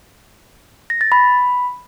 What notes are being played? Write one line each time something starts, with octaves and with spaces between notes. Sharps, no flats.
A#6
A6
B5